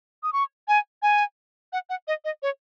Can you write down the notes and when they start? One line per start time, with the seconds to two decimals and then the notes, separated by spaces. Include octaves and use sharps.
0.23 D#6
0.33 C#6
0.68 G#5
1.02 G#5
1.73 F#5
1.90 F#5
2.08 D#5
2.25 D#5
2.43 C#5